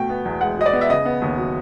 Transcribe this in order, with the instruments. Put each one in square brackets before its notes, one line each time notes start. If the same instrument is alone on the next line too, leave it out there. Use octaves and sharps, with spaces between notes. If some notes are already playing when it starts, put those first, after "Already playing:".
Already playing: [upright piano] B2 A3 G5
B3
E2
G#3 F#5
B2 D#5
D5
B3
E5
C#3 D#5
B3
D#2
F#3